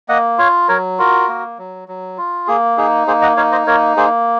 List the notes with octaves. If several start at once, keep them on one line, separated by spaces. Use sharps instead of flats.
A#3 D#5 F#5
F4 C#5 F5
F#3 A#4 C#5
F4 F#4 A#4
A#3
F#3
F#3
F4
A#3 G#4
D#4 G#4
A#3 G#4 C5
D#5 F#5
D#4 C#5 F5
C5 D#5
A#3 A#4 C#5
A#3 G#4 C5